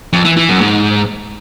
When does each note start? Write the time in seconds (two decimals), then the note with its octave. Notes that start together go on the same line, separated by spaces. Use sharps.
0.13 F2
0.25 E3
0.37 E3
0.49 F#2
0.61 G#2